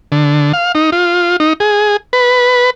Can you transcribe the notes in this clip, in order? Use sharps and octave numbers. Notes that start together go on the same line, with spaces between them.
D3
F5
D#4
F4
D#4
G#4
B4